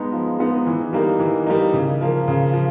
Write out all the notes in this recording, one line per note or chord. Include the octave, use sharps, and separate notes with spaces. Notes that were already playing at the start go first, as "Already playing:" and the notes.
Already playing: G#3 B3 D#4
F3
G#3 B3 D#4
E3
G3 A#3 D#4
E3
G3 A#3 D#4
C#3
F3 A#3
C#3
F3